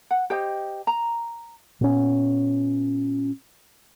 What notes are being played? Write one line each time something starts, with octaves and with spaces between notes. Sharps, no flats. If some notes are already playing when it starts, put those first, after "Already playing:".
F#5
G4 C5 D#5 G5
A#5
A#2 B3 C#4